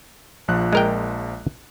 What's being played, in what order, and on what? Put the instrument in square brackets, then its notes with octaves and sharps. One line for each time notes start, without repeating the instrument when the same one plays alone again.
[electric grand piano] A#1 F3 F#6
[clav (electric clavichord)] G#3 A#4 G5